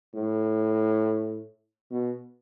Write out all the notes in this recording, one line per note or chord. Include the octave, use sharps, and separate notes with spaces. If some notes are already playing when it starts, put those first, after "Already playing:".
A2
B2